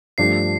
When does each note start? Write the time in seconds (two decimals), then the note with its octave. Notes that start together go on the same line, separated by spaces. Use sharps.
0.18 G2 F3 A3 D4 G4 C7